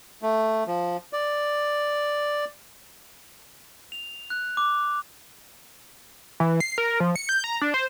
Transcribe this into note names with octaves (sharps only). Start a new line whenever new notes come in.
A3
F3
D5
F7
F#6
D6
E3
C7
A#4
F3
C#7
G6
A#5
D4
C5